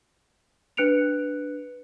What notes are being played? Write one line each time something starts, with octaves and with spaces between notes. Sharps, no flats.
D4 B4 F#6 C#7 D7 F7